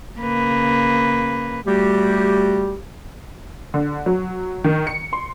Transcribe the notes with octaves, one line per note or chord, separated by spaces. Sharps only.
C#3 A#3 B4
G3 A3 F#4 G4
D3
F#3
D#3
C#7
C6